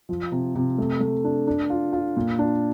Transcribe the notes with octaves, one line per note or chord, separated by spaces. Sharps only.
F3
C3
C3
A3
A3
D4
D4
F4
F4
A#2
D4